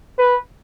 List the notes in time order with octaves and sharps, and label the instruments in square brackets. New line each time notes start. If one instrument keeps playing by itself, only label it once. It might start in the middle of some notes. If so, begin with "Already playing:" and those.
[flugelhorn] B4